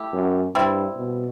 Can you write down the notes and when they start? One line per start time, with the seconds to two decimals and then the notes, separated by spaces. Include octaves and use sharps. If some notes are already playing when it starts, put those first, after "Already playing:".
Already playing: A3 E4 G4
0.13 F#2
0.55 G2 G3 C4 E4
0.97 B2